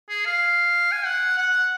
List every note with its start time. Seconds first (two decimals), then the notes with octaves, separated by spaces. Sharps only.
0.09 G#4
0.25 F5
0.92 G#5
1.05 F#5
1.37 F#5